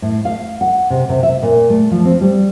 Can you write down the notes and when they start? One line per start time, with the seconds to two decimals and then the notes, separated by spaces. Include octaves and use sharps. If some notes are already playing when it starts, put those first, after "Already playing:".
0.02 A2
0.25 F5
0.61 F#5
0.90 C3
1.09 C3
1.23 E5
1.43 A#2
1.70 A3
1.91 F3
2.05 C4
2.21 G3